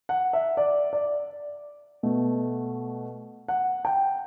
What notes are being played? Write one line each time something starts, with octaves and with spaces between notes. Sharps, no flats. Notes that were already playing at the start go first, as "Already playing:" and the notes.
F#5
E5
D5
D5
B2 A3
F#5
G5